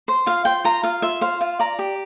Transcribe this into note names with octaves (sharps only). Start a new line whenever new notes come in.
C5
F4 F5
C5 G5
F4 A#5
F4 F5
F4 E5
C5 F5
F4 F5
D5 A#5
G4